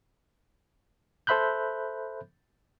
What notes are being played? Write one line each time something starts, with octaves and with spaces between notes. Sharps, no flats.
A4 C5 E5 B5 F#6 G6